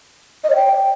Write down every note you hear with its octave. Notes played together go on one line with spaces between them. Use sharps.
D#5
C#5
G5